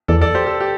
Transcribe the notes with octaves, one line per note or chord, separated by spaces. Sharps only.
E2 A4 D5
A4 D5
G4 C5
A4
G4